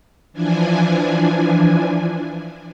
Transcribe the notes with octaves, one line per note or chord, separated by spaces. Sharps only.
E3 F3 D4 G#5